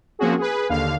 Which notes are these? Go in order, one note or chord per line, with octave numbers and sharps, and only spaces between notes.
F3 A#3 C4 C#4 F#4 G#4
G#4 B4
D#2 D3 F5